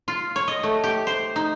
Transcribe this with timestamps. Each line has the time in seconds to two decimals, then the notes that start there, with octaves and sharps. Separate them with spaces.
0.08 F4
0.36 C#5
0.48 D#5
0.63 A3
0.84 G4
1.07 C5
1.36 D#4